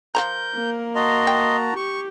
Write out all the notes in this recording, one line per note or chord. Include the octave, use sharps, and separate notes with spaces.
F3 A#4 C#5 A#5 G6
A#3
F#4 D#5 A5 A#5 C6
G5
G4 C#6